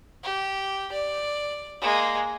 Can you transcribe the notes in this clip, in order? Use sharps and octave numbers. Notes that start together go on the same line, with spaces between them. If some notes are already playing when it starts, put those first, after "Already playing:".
G4
D5
G#3 A#3